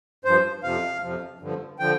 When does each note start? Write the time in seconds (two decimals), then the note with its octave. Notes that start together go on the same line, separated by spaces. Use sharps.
0.25 G2 F3 C5
0.63 F2 C3 F3 F5
1.02 F2 C3 F3
1.40 G2 D3 F3
1.79 D3 F3 G5